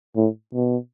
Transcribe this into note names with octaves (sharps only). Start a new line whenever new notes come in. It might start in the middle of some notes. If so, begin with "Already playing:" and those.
A2
B2